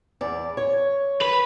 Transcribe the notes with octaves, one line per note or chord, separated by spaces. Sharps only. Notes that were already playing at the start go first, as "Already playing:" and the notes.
E2 D5
C#5
B4